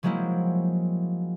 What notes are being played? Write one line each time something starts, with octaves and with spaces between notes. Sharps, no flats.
F3 F#3 G#3 A#3 C4 E4